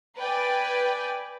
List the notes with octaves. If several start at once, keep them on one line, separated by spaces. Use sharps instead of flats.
B4 D5 G5 G#5